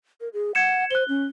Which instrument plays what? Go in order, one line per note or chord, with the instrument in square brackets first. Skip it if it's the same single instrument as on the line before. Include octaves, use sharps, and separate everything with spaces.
[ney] A#4
G#4
[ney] F#5 [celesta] G#6 C#7 E7
[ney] C5 [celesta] F#6 G7
[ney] C#4